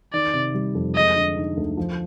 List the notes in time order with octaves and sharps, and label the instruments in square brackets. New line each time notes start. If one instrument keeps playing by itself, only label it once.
[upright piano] D#3 [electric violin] D5
[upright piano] C3
G3
F2
[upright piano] G#3 [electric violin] D#5
[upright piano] D3
D#4
D2
F3